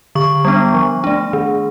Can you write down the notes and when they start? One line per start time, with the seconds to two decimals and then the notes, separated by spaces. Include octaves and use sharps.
0.15 D3 C#6
0.45 G3 B3 D4
0.74 F3
1.04 A3 D4
1.33 D#3